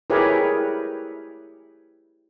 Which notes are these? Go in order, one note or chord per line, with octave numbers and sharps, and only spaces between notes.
E4 G4 G#4 A#4 B4 C#5